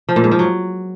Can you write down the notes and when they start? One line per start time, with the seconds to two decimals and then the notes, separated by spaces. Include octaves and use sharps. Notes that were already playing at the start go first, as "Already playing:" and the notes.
0.09 F3
0.16 A#2
0.24 G#2
0.31 F3
0.39 F#3